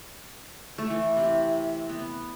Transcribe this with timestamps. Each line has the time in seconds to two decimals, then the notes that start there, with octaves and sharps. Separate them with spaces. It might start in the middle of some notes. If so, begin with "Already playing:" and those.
0.78 A3
0.90 E3
1.17 C3
1.90 B3